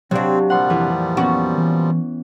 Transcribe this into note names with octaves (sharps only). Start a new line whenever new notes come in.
C3 F#3 C4 D4 F#4 F5
A#2 F3 G3 F#5 C6
F2 E3 A4 A5 F#6
B3 C#4 F#4
E3